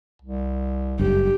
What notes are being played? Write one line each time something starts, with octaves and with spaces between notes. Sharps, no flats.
C2
F#1 G2 G4